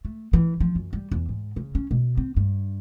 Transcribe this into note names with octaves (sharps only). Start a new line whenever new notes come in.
A3
E3
F3
F#2
G3
E2
G#2
C#3
C#4
B2
C4
G2